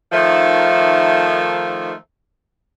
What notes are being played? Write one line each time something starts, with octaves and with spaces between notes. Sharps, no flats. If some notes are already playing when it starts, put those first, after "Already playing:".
D#3 F3 A3